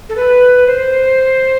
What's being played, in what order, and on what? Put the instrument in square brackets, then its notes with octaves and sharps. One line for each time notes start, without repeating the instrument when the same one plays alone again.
[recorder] A4
B4
C5